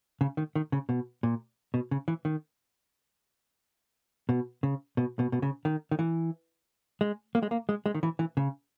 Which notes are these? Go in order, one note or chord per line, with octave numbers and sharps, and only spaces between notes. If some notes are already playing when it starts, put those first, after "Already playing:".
C#3
D#3
D#3
C#3
B2
A#2
B2
C#3
E3
D#3
B2
C#3
B2
B2
B2
C#3
D#3
D#3
E3
G#3
A#3
G#3
A#3
G#3
G#3
D#3
E3
E3
C#3